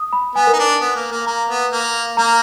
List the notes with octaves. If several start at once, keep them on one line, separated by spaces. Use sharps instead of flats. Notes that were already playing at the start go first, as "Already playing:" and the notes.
Already playing: D#6
B5
B3 G#5
A#4
D#4
D4
B3
A#3
A#3
A#3 A#5
B3
A#3
A#3 A#5